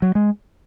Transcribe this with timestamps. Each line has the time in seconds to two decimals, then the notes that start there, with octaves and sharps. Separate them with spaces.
0.02 F#3
0.15 G#3